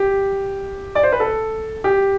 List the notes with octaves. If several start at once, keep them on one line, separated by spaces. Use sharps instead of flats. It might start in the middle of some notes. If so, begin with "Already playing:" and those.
Already playing: G4
D5
C5
B4
A4
G4